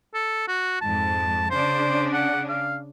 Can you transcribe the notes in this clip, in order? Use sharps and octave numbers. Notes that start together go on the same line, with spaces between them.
A4
F#4
F2 G#2 A5
C#3 D4 C5
F#5
F5